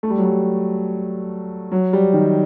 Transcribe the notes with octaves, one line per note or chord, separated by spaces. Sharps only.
A3
G3
F#3
G3
F#3
G3
D#3